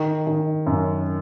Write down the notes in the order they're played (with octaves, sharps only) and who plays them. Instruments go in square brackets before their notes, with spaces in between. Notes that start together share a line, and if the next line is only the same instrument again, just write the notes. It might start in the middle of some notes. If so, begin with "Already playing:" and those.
Already playing: [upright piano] D#3
D#3
F#2